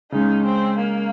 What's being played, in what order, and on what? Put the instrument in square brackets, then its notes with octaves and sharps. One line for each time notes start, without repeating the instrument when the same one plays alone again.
[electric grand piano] C#3 G#3 C#4 [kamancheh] D#4
[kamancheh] C4
A#3